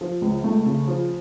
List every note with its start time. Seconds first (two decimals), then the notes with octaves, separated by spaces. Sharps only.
0.01 F3
0.22 C#2
0.44 A3
0.66 C#3
0.88 F3